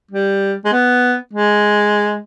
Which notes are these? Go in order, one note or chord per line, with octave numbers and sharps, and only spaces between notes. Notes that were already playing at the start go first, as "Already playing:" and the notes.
G3
G#3
B3
G#3